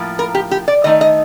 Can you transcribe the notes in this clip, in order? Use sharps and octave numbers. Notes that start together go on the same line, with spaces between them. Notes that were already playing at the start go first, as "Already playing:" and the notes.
Already playing: A2 F3 A#3
A#4
G4
G4
D5
D#3 A3 D#4 D#5
D#5